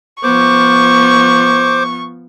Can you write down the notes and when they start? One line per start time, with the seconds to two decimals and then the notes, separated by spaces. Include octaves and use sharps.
0.23 F3 B3 C5 C#6 D6